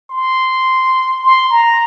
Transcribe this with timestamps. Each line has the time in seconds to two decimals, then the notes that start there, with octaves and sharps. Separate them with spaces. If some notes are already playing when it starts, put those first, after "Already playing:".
0.10 C6
1.23 C6
1.50 A#5